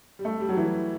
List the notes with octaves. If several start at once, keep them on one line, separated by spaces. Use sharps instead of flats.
G3
A3
G3
F#3
E3